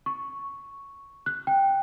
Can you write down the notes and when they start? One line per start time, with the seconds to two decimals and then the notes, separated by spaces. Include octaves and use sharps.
0.06 C#6
1.26 F#6
1.47 G5